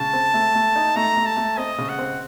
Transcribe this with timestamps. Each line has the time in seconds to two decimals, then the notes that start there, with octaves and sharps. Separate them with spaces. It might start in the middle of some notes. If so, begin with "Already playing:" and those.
Already playing: C#3 A5
0.13 C4
0.34 A3
0.55 A3
0.76 D#4
0.96 A3 A#5
1.17 A3
1.26 A5
1.37 A3
1.57 C4 D#5
1.78 C#3
1.89 F#5
1.99 C4